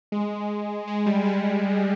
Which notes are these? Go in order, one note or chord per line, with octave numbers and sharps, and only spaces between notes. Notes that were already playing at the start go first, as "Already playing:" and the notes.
G#3
G#3
G3
G#3